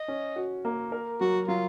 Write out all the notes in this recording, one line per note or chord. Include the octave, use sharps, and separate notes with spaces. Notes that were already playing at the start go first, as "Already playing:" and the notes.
Already playing: D#5
C#4
F#4
A#3
A#4
F#3 F#4
F#3 F4